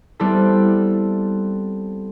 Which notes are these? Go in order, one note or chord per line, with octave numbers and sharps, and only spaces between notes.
G3 B3 C4 E4 A4